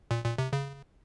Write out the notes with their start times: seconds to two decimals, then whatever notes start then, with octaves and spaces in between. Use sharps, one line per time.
0.11 A#2
0.24 A#2
0.38 C3
0.53 C#3